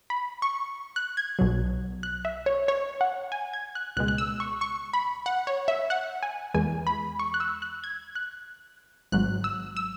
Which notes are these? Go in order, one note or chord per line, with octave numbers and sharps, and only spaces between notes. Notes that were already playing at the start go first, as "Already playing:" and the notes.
B5
C#6
F#6
G#6
B1 B2 F#3
F#6
E5
C#5
C#5
F#5
G#5
G#6
F#6
C#2 B2 G#3 F#6
F#6
E6
C#6
C#6
B5
F#5
C#5
E5
F#5
G#5
E2 E3 G#3 G#5
B5
C#6
F#6
E6
F#6
G#6
F#6
G#1 G#2 F#3 F#6
E6
E6